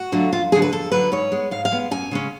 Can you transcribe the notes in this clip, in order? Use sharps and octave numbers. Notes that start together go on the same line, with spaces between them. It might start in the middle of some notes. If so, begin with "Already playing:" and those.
Already playing: F#4
D3 F#3 A3 F4
F2 F4
D3 F#3 G#4
B4
F2 A4
D3 F#3 B4
G#2 C#5
G#3 B3
G#2 F5
F5
G#3 B3
F#2 G#5
C#3 G#3 C#4